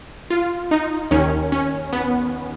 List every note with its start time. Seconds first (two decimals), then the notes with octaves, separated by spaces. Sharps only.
0.31 F4
0.71 D#4
1.11 D#2 D#3 C#4
1.52 C#4
1.93 B3